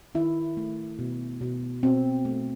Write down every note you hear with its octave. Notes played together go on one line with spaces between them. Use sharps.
D#3 E4
A3
B2
B2
B2 C4
A3